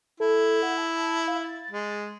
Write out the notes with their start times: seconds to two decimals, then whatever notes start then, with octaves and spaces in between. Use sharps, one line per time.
0.20 E4 A4
0.63 F#5
0.78 A5
1.28 F5
1.44 A6
1.71 G#3